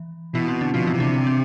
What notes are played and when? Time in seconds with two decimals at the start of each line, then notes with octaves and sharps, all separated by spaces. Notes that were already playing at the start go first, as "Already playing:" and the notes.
Already playing: E3
0.35 B2 E3 E4
0.48 C4
0.61 D3 D4
0.74 B2 F3 F4
0.87 E3 E4
0.94 C3
1.00 D3 D4
1.14 D4
1.27 C4